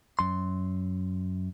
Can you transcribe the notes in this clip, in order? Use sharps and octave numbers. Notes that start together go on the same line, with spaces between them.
F#2 C6